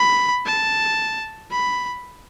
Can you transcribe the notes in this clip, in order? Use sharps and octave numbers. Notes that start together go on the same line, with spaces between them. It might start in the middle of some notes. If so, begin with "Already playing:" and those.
Already playing: B5
A5
B5